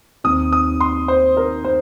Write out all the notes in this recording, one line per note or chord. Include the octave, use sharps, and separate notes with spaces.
D#2 D#3 C4 D#4 D#6
D#6
C6
C5
A#4
C5